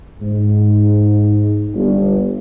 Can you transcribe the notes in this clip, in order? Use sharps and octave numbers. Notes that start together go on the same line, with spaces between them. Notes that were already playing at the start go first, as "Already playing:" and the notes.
G#2
G1